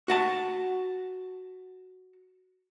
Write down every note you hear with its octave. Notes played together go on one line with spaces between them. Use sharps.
F#4 F#5 A5